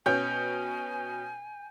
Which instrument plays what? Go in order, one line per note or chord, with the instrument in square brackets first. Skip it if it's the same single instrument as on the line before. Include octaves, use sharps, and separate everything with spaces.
[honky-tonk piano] B2 C#4 [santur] G5 [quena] G#5